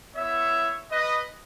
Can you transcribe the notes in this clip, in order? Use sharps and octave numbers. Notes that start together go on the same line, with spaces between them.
B3 E4 C#5 E5
B4 D#5